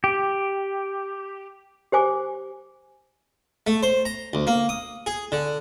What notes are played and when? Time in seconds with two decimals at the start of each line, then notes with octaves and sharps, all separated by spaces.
0.04 G4
1.92 G4 C5 G#5 D6
3.67 A3
3.83 C5
4.05 A#5
4.33 D2
4.47 A#3
4.69 D#6
5.06 G#4
5.32 D3